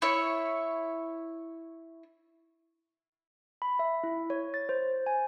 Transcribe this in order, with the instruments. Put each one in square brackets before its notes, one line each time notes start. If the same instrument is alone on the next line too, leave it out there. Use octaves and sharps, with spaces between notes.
[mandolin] E4 C#5
[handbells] B5
E5
E4
C#5
A6
C5
G#5